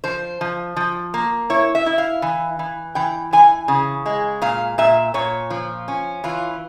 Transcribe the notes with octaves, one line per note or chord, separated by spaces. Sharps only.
F3 C5
F3
F3
A#3
E4 C#5
E5
E4
F5
E3
E3
E3 G5
E3 G#5
C#3
G#3
A#2 F5
A#2 E5
A#2 C#5
F3
C#4
E3 F4